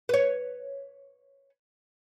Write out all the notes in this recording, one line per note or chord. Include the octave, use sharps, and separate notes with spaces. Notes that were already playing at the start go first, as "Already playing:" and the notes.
B4 C#5